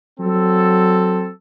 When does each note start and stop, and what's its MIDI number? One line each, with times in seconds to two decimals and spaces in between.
0.20 1.29 54
0.20 1.29 60
0.20 1.29 69